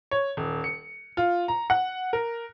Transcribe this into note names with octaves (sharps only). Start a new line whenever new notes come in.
C#5
D#1
C#7
F4
A#5
F#5
A#4